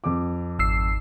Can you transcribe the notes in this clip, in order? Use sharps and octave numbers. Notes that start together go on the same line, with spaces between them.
F2 D6
G#1 E6 C7